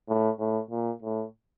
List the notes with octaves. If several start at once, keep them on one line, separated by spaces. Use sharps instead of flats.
A2
A2
A#2
A2